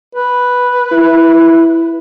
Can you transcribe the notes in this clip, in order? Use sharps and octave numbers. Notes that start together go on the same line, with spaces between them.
B4
E4